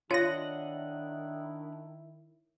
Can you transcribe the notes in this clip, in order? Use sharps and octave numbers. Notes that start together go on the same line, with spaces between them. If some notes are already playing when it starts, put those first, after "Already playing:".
D#3 D4 E4 F4 C#5 D#5 F#5 A#6